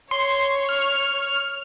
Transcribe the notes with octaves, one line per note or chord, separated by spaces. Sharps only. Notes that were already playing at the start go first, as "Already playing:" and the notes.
C#5 C6 C#6
F6